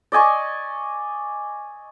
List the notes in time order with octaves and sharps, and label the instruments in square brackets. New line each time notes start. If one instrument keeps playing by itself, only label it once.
[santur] D5 D#5 G#5 C#6